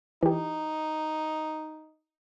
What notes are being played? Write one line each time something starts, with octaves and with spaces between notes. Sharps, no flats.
E3 D#4 G4